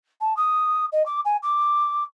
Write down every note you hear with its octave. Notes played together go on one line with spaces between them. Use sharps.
A5
D#6
D#5
D6
G#5
D6